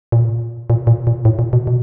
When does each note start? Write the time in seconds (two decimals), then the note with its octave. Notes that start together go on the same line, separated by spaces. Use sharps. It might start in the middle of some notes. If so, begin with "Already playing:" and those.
0.12 A#2
0.70 A#2
0.87 A#2
1.07 A#2
1.25 A2
1.39 A#2
1.53 B2
1.67 B2